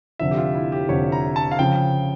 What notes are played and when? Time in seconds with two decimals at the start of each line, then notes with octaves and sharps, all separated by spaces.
0.19 F1 F2 D3 E5
0.31 G4
0.37 F4
0.55 E4
0.72 G4
0.89 F1 F2 D3 C#5
1.12 A#5
1.36 A5
1.51 F5
1.59 C#3 F3 G5